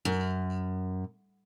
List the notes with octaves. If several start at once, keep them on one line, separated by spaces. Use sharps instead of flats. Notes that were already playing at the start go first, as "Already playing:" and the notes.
F#2